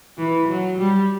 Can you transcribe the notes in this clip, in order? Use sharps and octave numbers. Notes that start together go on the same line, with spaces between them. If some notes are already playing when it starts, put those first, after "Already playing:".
E3
F#3
G3